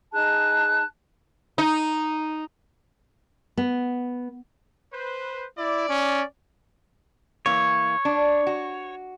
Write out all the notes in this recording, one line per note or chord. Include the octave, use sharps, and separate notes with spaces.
D#4 G#4 A5 F#6
D#4
B3
B4 C5
E4 D5
C#4
E3 A#3 C#5
D4
F#4